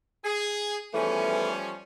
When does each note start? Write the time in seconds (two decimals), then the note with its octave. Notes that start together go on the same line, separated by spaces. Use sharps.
0.23 G#4
0.94 E2 E3 F3 G3 A3 C#4